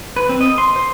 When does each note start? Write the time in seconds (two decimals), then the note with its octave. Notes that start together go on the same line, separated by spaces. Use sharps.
0.16 B4
0.29 C4
0.41 D#5
0.58 C6
0.76 C5